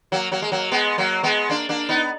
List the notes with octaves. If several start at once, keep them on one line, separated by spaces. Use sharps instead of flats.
F#3 A#3
F#3 A#3
G#3
F#3 A#3
G#3 B3
F#3 A#3
G#3 B3
A#3 D4
A#3 D4
B3 D#4